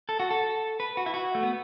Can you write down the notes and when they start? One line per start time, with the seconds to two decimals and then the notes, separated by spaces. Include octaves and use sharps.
0.09 A4
0.20 F#4
0.31 A4
0.80 B4
0.97 F#4
1.06 E4
1.14 F#4
1.35 A3
1.43 B3